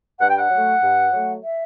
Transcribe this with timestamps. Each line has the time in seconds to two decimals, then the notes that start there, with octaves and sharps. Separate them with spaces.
0.20 G2 F#5
0.29 G5
0.38 F#5
0.50 F#3 A3
0.82 G2
1.12 F#3 A3
1.43 E5